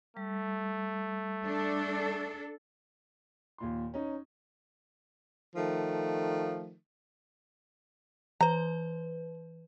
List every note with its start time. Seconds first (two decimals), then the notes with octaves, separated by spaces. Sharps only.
0.17 G3 A3
1.45 D4 A4
3.58 D#2 A#2 C6
3.94 C#4 D#4
5.56 D#3 F3 A3
8.41 E3 B4 A#5